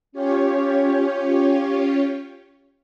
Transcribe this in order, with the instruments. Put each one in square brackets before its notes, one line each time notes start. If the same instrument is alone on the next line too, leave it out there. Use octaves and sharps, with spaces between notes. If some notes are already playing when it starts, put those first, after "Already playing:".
[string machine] C#4 F4 G4 C#5